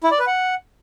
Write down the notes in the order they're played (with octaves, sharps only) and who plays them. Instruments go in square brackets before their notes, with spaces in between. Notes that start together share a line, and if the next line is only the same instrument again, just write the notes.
[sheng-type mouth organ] E4
D5
B4
F#5